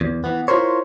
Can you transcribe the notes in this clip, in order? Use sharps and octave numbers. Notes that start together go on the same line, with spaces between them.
E2
E3 B3
E4 F4 G#4 A#4 C5 C#5